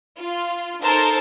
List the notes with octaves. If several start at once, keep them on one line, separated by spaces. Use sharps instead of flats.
F4
D#4 A4 A#4 C5 A5